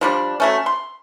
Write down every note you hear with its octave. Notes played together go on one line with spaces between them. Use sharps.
F3 G3 D4
F#3 A3 C#4
C6